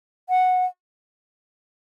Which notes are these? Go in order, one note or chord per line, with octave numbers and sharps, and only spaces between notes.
F#5